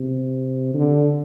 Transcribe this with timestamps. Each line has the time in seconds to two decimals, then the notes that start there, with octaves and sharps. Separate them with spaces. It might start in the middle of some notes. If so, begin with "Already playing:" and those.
Already playing: C3
0.74 D3